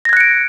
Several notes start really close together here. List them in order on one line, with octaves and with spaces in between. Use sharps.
A#6 G#6 F#6 C#7 D7